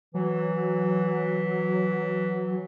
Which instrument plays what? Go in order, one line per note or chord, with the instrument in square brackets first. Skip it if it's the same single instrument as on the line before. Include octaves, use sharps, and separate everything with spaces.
[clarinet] E3 [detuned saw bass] F#3